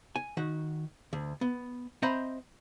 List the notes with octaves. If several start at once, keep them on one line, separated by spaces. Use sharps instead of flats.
G#5
D#3 F#4 F#5
D2
B3
C4 C5 D#5 E5 A#5 B5